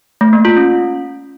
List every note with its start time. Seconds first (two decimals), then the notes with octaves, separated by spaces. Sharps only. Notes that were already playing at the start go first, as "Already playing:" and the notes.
0.21 A3
0.33 A#3
0.45 F4
0.57 C#4